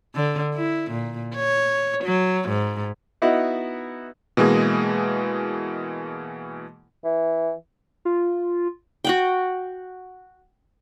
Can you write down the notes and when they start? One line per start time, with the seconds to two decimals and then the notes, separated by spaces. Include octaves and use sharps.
0.15 D3
0.54 E4
0.91 A#2
1.35 C#5
2.04 F#3
2.49 G#2
3.22 B3 D#4 E4 F#4
4.37 B2 E3 G#3 A#3 G#4
7.04 E3
8.05 F4
9.05 F#4 F#5 G5